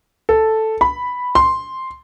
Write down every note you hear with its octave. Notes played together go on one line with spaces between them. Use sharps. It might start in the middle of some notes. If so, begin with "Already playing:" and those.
A4
B5
C6